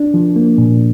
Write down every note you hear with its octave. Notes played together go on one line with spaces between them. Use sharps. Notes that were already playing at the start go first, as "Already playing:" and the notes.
Already playing: D4
F3
A#3
A#2